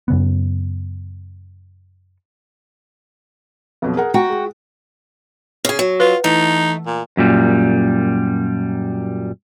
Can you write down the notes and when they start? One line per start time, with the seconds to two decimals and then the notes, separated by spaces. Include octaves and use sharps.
0.08 F#2 C#3 B3
3.82 F2 B2 F#3
3.96 G#4 A#4 F#5
4.14 F#4 F#5 G5 A#5
4.30 G#3
5.65 C#3 G#4
5.79 F#3
6.00 F4 B4
6.24 E3 A3 D#4
6.86 A#2
7.17 F#2 A#2 G3